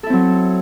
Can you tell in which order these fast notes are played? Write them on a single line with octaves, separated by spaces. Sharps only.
A4 E4 C4 F#3